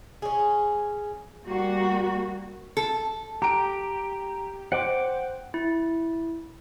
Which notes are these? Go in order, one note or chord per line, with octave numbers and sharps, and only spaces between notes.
C#4 G#4
G3 A#3 F#4
A4
G4 A#5 D7
C5 F#5 G5 D6
E4